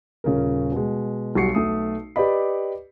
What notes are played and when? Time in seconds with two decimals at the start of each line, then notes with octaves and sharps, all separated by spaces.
0.24 D#1 C#3 C#4 A#4
0.72 B2 G#3
1.35 B1 G3 F#4 C#6 C7 C#7
1.55 B1 A3 D#6
2.16 G4 B4 D5 D#5 B5